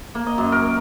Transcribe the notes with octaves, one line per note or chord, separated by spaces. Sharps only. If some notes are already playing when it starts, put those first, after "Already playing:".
A#3
D#5
F#2
A#4